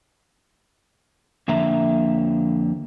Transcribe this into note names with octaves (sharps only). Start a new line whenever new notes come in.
F2 D3 A#3 E5 A#5